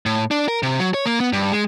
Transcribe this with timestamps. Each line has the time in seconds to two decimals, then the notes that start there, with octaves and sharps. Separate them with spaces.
0.06 A2
0.31 D4
0.48 A#4
0.63 C3
0.79 F#3
0.94 C#5
1.06 A#3
1.20 B3
1.33 G2
1.52 G#3